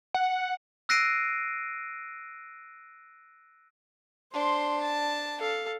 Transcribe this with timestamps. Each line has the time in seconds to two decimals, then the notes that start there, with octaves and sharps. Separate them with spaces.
0.14 F#5
0.89 E6 F#6 A#6 C7 D7 D#7
4.33 D4 C5 C6
4.81 A5
5.40 A4 F5